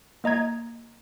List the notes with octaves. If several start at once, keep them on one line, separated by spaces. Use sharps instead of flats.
A#3 D#5 A#5 G#6